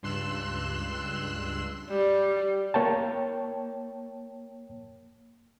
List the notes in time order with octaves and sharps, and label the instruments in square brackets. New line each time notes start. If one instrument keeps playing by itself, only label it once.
[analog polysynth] C#2 G2 C6 E6 F#6 E7
[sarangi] G3
[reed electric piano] A#3 C#5 G5 A5